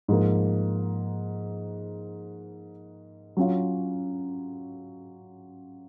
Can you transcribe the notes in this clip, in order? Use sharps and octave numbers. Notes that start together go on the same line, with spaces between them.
G#2 F3 A#3
F#3 C#4 F4